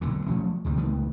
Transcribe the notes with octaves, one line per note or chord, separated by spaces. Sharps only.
B1 A#2 D3
F3 F#3 A3 C#4
D2 C3 G3
C#2 D#3 A3 B3